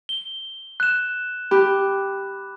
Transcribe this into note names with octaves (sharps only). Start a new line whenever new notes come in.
G7
F#6 E7
G4 B5 F#6